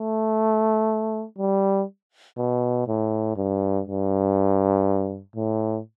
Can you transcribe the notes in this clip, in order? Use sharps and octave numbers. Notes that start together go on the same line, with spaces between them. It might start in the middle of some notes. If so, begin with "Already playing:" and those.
Already playing: A3
G3
B2
A2
G2
G2
A2